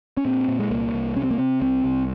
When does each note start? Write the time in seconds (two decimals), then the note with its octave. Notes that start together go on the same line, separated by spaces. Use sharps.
0.17 C#4
0.25 A#2 C4
0.48 A#2
0.59 G#3
0.70 C2 A#3
0.93 C2
1.16 C3 C#4
1.23 C4
1.31 A#3
1.38 C3 C4
1.62 C2 C4
1.84 C2